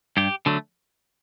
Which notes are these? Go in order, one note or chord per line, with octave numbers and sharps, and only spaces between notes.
G2 G4
D3 F#3 A3